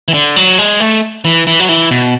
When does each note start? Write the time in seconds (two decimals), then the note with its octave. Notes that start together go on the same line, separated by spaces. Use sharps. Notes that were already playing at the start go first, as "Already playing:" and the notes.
0.08 E3
0.14 D3
0.36 F#3
0.58 G#3
0.80 A3
1.25 E3
1.47 E3
1.60 F#3
1.69 E3
1.91 B2